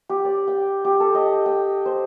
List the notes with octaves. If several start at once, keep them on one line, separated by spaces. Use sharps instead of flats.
G4
D5
G5
G4
A4
D#5
G5
C5